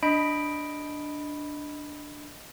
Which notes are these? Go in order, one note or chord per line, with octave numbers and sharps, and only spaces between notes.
D4 D#5 B5 D7